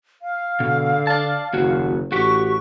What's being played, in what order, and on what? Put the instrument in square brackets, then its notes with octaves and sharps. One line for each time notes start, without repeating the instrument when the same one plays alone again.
[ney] F5
[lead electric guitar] B2 [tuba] D3
[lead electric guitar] D5 A5
[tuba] F#1 [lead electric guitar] D#2 F#4
[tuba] A1 [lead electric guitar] F#4 G4 [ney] C#6